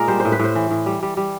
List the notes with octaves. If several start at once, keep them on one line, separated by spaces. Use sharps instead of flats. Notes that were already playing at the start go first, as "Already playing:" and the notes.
Already playing: A#2 G#3 A#4
G3 C5
A2 C5
B4
A2 C5
E3
A2
G3
G3
G3